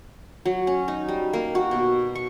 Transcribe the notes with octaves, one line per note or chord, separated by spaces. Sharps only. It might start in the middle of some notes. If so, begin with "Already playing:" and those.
F#3
C#4
D#4
G3
A#3
F#4
B2
C#6